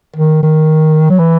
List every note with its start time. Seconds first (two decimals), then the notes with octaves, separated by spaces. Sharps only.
0.16 D#3
0.43 D#3
1.10 F#3
1.19 E3